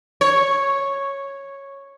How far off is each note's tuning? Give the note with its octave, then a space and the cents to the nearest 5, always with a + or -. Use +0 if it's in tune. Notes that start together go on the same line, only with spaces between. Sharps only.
C#5 -5